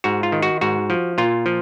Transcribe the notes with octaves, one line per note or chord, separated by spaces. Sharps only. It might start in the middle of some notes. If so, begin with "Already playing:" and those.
G#2 F#4
F4
D#3
F#4
G#2 F#4
F3
A#2 F4
F3